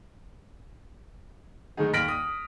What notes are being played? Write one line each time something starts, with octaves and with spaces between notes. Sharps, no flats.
D#3 G#3 A3 D#4 G#4
D#2 F6 A#6 B6 D7 F#7
D#6